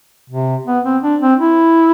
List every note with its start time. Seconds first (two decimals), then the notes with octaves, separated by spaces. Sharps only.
0.30 C3
0.67 B3
0.85 C4
1.03 D4
1.21 C4
1.40 E4